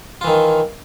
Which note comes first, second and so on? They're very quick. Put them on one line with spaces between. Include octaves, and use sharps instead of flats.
F4 E3 D#3